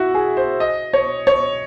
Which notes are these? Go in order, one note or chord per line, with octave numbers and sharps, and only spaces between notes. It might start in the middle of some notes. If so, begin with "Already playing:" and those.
Already playing: E4 F#4
G#4
C5
D#5
C#5
C#5